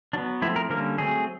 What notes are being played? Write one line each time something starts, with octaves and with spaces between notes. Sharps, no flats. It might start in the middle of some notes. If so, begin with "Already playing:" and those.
F#3 B3 D4
F3 A3 C4 E4
A#4
D3 G3 A#3 C#4 A#4
F#3 A3 C4 G#4